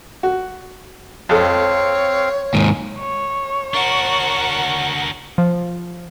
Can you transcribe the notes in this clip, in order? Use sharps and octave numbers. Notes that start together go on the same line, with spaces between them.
F#4
F2 C4 A4 C#5 F5
D#2 G#2
C#5
D4 F#4 A#4 F#5
F3